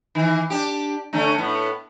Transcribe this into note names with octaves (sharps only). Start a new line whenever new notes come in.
D#3 E3
D4 G4
D3 A3 C#4
A2 B3